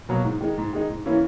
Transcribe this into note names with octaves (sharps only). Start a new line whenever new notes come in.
B2 F#3 A#3
G#2
D#3 G#3 D#4
G#2
D#3 G#3 D#4
G#2
E3 A#3 C#4 E4